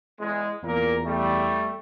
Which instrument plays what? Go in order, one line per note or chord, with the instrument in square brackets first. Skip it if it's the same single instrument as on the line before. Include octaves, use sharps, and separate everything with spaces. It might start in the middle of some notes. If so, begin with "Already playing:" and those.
[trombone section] E2 G#3
[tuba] E2 [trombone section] A#2 A#3 A#4
[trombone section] G3 A3